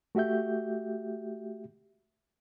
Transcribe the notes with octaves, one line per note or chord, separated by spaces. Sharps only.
A3 F#4 G4 E5 G6